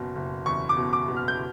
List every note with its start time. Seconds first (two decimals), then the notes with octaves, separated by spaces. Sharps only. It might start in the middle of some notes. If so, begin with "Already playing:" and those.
Already playing: F#1 B2
0.15 F#1
0.46 E2 C#6
0.69 D6
0.77 B2
0.93 D6
1.08 B2
1.16 F6
1.28 G6